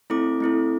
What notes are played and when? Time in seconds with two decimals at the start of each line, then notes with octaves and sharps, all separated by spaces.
0.10 A3 C4 E4 A4 D6
0.40 A3 C4 E4 A4